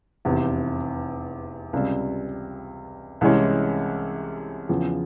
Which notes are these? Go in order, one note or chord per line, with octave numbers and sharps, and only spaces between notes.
F1 E2 C3
C#2 C3 G3
C2 C3 E3 G#3 C#4
E2 C#3 F3